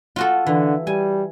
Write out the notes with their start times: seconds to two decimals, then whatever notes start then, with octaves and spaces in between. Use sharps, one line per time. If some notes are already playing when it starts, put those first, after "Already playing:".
0.16 F4 F#4 A4
0.47 D3 E3
0.87 G3 G#5